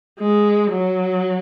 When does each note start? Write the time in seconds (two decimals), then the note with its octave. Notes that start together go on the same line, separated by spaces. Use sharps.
0.19 G#3
0.71 F#3